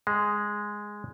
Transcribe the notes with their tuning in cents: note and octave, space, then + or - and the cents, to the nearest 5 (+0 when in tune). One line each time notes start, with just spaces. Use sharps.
G#3 -5